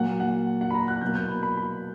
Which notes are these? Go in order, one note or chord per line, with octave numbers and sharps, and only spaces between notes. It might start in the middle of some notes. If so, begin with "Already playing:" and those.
Already playing: A#2 F#3 A#3 F#5
F#5
F#5
B5
A#5
F#6
B2 F#3 A#3 G6
G6
B5
B5
B5